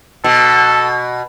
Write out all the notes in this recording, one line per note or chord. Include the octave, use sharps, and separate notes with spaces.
B2 A4